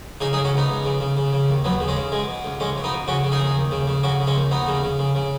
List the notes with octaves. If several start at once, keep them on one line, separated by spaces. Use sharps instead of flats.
C#3 D#4 G#4
D#4 G#4
C#3
C#4 F#4
C#2 B3 D#4
C#2
C#3
C#3
C#3
C#3
D#2
D#2 F#3 B3
C#3
G#3 C#4
C#3
B2 G#3
B2
C#2
C#2 G#3 C#4
B2
B3 D#4
B2
C#3 C#4 F#4
C#3
D#4 G#4
D#2
D#2
C#3
C#3
C#3 C#4 F#4
C#3
G#3 C#4
D#2
D#2 B3 D#4
C#3
C#3
C#3
C#3